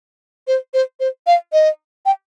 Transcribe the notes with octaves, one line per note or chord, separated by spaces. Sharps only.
C5
C5
C5
F5
D#5
G5